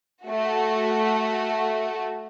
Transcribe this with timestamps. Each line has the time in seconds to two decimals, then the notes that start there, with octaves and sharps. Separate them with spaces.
0.24 A3 F#4